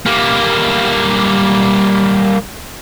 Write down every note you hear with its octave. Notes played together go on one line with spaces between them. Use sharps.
G3 A#3